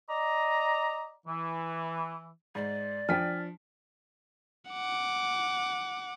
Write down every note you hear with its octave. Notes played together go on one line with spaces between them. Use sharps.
D5 D#5 A#5
E3
G#2 D5
F3 D4 G5 G#5 F6 B6
F#5 D6